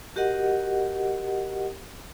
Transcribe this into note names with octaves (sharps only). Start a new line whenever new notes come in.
F#4 G4 A#4 D#5 F#5